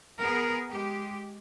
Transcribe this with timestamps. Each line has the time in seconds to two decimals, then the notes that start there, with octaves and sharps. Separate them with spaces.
0.20 B3 G#4 A#4
0.69 G#3 G4